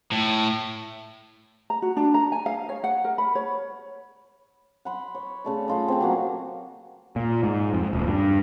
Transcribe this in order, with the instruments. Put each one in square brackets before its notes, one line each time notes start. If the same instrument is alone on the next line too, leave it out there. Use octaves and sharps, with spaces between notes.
[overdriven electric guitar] A2
[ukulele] A#5
F#4
D4
A#5
G#5
F5
C#5
F#5
A#4
B5
C#5
[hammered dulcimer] F#5 B5 C6
C#5
C#3 A3 D5
A3 F4 D#5
C4 G#4 G5
F#3 A#3 F#4
[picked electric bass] A#2
G#2
F2
D#1
G2